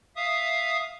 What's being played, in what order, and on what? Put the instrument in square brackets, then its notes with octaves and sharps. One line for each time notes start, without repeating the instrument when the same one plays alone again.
[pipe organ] E5 F5 D#6